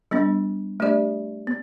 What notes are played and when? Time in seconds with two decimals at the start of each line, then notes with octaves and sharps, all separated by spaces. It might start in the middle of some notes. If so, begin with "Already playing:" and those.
0.11 G3 B3 D4
0.80 A3 D4 G4 D5
1.47 B3